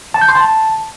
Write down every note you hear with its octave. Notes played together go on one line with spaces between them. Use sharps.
A5
G6
C6
A5